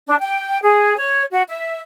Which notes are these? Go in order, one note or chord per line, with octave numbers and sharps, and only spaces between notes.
D4
G5
G#4
C#5
F#4
E5